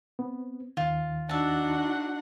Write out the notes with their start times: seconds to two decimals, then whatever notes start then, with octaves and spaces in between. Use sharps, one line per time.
0.19 B3 C4
0.77 D#2 D#3 F4
1.29 D4 D#4 F#4 E5 F#5 A5